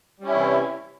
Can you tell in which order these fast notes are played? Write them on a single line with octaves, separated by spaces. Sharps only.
G3 C#4 E4 C3 E3